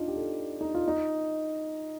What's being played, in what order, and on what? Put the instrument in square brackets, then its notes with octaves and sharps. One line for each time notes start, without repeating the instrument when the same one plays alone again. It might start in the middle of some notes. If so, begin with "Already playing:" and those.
Already playing: [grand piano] D4 D#4 F4
G4
A4
D#4
F4
D#4